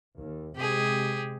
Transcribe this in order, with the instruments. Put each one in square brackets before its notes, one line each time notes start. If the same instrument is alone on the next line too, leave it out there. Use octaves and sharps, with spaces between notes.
[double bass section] D#2
[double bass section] C3 G#3 [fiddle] G4 G#4